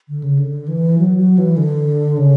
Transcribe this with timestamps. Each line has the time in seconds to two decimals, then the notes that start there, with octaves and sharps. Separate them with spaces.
0.09 D3
0.23 C#3
0.39 D3
0.68 E3
0.98 F#3
1.17 F#3
1.38 E3
1.57 D3
2.17 C#3